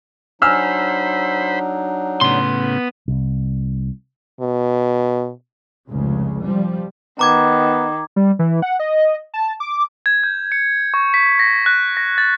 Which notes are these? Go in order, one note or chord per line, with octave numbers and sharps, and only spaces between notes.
F#3 D4 D#4 C5 G#5 B5 E6 F6
A2 C#3 B3 C6
C2
B2
F1 C#2 C#3
F3 G3
D#3 B3 A#5 D6 G#6
G3
E3
F#5
D#5
A5
D6
G#6
G6
C#7
C#6
B6
A#6
F#6
A#6
A6